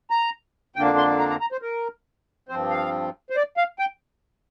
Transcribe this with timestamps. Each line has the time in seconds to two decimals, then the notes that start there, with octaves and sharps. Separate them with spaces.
0.11 A#5
0.76 F2 D3 A#3 D4 G5
0.97 C6
1.19 A#5
1.30 A#5
1.41 A#5
1.52 C5
1.62 A#4
2.49 G2 F3 C4 C5
2.70 F5
3.30 C5
3.36 D5
3.57 F5
3.79 G5